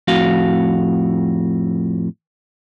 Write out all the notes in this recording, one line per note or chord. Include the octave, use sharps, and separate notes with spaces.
F2 A2 F#4 F5